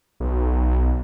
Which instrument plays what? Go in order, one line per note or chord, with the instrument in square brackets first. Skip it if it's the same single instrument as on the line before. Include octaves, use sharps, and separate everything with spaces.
[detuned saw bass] B1